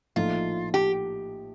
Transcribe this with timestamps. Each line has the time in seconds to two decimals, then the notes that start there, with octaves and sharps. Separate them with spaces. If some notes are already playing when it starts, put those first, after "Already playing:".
0.16 A#1 A2 F3 A3 D#4 F4
0.74 G4